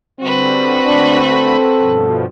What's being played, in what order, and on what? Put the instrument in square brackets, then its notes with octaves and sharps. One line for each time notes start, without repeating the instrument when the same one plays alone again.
[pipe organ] D3 G3 [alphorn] C4 [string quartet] F#4 B4
[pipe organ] D3 A3 B5 [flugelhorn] D4
[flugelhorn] A4
[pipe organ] G2 B2 F3